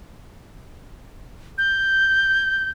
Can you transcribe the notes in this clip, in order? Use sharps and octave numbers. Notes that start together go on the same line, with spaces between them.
G6